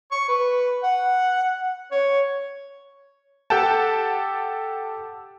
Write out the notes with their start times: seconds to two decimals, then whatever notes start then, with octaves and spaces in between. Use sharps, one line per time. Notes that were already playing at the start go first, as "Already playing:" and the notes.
0.11 C#6
0.29 B4
0.83 F#5
1.91 C#5
3.50 G4 A4 F#5 G5 A5